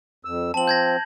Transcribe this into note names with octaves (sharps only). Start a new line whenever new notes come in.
F2 E6
F3 C4 A5 F#7
G6 G#6 A#6